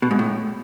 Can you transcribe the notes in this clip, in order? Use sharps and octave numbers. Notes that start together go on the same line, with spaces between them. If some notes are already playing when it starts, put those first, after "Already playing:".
B2
G#2
A2